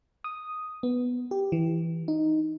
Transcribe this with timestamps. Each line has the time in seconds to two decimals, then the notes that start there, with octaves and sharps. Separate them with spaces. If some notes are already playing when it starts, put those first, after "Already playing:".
0.24 D#6
0.83 B3
1.31 G4
1.52 E3
2.08 D#4